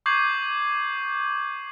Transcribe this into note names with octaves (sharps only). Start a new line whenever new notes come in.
C#6 D6 G6 G#6 C7 F#7